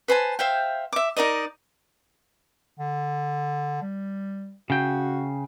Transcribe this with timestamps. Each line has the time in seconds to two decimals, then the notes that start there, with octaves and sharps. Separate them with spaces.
0.08 B4 C5 G#5 A5
0.39 C5 E5 F5 G5
0.93 E5 D6
1.17 D#4 A#4 D5 D#5
2.79 D3
3.82 G3
4.70 C#3 F#4 G5